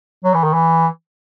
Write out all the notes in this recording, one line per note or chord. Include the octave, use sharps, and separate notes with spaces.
F#3
E3
D#3
E3